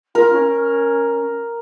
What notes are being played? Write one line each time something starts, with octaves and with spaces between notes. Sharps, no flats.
F4 A#4
C#4